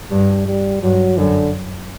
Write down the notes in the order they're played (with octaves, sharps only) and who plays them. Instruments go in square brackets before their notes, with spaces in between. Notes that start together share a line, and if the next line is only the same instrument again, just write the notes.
[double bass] G2 [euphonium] G3
[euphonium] G3
[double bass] G2 [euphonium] F#3
[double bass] F#2 [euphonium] D3